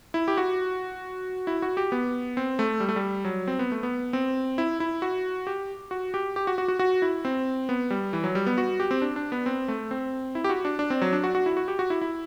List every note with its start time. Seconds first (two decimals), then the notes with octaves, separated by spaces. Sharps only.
0.14 E4
0.28 G4
0.37 F#4
1.47 E4
1.62 F#4
1.77 G4
1.92 B3
2.37 C4
2.59 A3
2.80 G3
2.89 A3
2.96 G3
3.25 F#3
3.47 C4
3.59 B3
3.72 A3
3.83 B3
4.13 C4
4.58 E4
4.80 E4
5.02 F#4
5.47 G4
5.91 F#4
6.14 G4
6.36 G4
6.47 F#4
6.58 F#4
6.68 F#4
6.79 F#4
7.02 E4
7.25 C4
7.69 B3
7.90 G3
8.13 E3
8.24 F#3
8.35 G3
8.46 B3
8.58 F#4
8.80 G4
8.91 C4
9.02 D4
9.16 D4
9.32 B3
9.46 C4
9.68 A3
9.91 C4
10.35 E4
10.44 G4
10.50 F#4
10.65 D4
10.79 D4
10.90 C4
11.02 F#3
11.13 D4
11.24 F#4
11.35 F#4
11.46 E4
11.57 F#4
11.68 G4
11.79 F#4
11.90 E4
12.01 E4